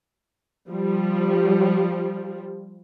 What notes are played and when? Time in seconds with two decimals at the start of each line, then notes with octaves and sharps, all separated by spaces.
0.69 F3 G3